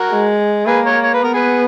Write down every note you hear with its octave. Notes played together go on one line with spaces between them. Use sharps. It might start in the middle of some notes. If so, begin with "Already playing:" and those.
Already playing: F#4 A#4
G#3
A#3 G#4 B4
A#4 C#5
C#5
B4
B3 A#4
G#4 B4